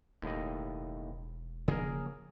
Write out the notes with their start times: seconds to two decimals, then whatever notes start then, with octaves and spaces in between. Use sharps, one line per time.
0.22 E1 D#2 A2 D#5
1.68 C#3 F3 A#3 G#4 A#4